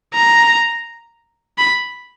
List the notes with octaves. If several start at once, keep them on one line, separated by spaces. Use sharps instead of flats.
A#5
B5